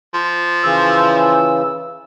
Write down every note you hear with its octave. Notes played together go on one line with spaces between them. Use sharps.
F3
C#3 E3 E6